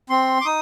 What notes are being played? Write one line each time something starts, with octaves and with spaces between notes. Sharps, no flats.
C4 C6
D6
D#4 D#6